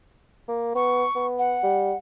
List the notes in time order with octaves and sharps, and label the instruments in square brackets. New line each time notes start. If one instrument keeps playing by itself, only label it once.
[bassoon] A#3
[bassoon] B3 [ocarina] C#6
[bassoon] B3
[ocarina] F#5
[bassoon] G3